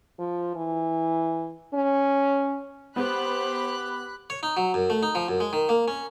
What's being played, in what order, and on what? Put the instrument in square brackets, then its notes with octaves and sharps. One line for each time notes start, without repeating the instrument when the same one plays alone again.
[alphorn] F3
E3
C#4
[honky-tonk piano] B3 [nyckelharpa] G4 [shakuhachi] C5 [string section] B5 F#6
[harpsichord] C#5
D#4
F#3
F#2
A3
D#4
F3
F#2
G#3
D#3
A#3
C#4